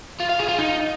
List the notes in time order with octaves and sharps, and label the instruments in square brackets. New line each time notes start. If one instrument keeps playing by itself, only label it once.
[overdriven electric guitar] F4
F5
G#4
F4
D#4